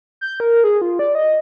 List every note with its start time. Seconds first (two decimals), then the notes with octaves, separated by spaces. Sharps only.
0.21 G6
0.40 A#4
0.64 G#4
0.81 F4
0.99 D5
1.15 D#5